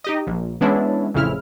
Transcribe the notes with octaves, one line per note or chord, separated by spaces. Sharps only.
D#4 G4 D#5
A#1
E3 G#3 B3 C#4 D4 E4
A1 F2 C#3 E4 F6